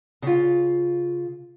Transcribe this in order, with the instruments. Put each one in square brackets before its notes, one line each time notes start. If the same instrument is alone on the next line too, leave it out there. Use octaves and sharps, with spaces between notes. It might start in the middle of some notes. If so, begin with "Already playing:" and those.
[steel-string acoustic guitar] C#3 F4